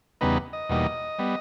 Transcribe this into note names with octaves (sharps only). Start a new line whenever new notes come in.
E2 C#3 G3 B3 D#4 B4
D#5
E2 B2 G3 A#3 D#4
G3 B3